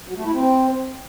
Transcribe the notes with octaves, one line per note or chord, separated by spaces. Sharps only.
F#3
A3
E4
C4